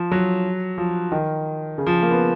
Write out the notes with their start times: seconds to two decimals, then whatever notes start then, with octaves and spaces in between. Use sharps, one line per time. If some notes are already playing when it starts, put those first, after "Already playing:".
Already playing: F3
0.11 F#3
0.78 F3
1.12 D#3
1.78 C#3
1.86 F3
2.02 A#3
2.11 B3